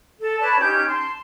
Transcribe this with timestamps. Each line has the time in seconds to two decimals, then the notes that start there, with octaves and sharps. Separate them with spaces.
0.20 A4
0.39 B4 C#5 D5 A5
0.60 C#4 D#4 G4 G6
0.86 A5 C6